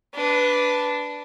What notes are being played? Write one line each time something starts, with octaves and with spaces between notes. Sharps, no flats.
D4 B4